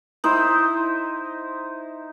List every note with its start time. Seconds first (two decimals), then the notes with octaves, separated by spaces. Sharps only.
0.24 D#4 E4 C5